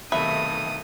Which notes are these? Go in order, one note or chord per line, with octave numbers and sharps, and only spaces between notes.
B1 C3 D#3 A3 B4 E5 D#6